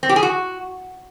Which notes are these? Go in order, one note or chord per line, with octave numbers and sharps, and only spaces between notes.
C4
G4
G#4
F#4